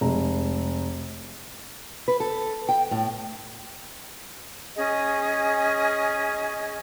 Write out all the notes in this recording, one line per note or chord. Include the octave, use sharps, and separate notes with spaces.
F1 G#3 A#5
B4
A4
G5
A2
C#4 G#4 D#5